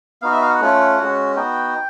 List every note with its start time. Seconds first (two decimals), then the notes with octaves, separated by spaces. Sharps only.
0.22 B3 D#4 F#4 F5
0.32 E5
0.42 F5
0.50 F#5
0.61 A3 C#4 F4
0.98 G#3 C#4 F#4
1.36 B3 D#4 F#4 G5